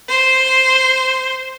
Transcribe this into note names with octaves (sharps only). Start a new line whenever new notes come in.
C5